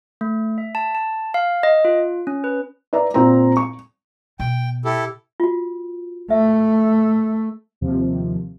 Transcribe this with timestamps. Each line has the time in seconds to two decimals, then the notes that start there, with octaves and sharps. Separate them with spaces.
0.21 A3
0.58 E5
0.75 A5
0.95 A5
1.34 F5
1.63 D#5
1.85 F4
2.27 C#4
2.44 B4
2.93 B4 D5 E5 A#5
3.14 A#2 C4 A#5
3.57 C#6
4.40 B2 G5
4.85 E4 G4 A4
5.40 F4 F#4
6.30 A3 E5
7.81 D#2 C3 F3